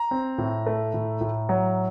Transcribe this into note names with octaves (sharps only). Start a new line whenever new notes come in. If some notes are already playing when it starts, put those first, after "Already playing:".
Already playing: A#5
C4
A2
A3
A2
A2
F#3